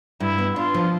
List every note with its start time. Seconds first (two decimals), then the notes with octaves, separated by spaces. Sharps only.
0.20 G2 E4
0.38 B3
0.56 D4 F4
0.74 F3